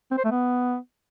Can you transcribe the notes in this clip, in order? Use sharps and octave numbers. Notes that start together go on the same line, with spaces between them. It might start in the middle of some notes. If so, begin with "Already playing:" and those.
C4
C5
A3
B3